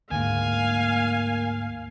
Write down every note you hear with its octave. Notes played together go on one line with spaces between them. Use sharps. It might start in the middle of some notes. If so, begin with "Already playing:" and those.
D2 G#2 A#3 F5 G#5